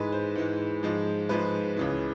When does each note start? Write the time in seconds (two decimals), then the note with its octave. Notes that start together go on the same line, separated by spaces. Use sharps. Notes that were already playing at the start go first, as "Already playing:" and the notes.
Already playing: G#2 E3 G#3 B4
0.12 C5
0.35 G#2 E3 G#3
0.83 G#2 F3 G#3
1.29 G#2 F3 G#3 B4
1.76 C#2 C#3 E3